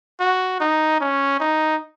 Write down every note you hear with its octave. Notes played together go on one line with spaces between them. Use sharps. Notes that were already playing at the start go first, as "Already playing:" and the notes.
F#4
D#4
C#4
D#4